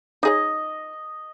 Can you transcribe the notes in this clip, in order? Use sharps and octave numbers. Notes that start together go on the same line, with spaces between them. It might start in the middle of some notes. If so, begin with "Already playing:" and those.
D#4 G#4 C#5 D#5